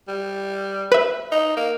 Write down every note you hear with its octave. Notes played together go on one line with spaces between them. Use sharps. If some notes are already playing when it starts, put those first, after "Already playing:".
G3
B4 E5
D#4
A#3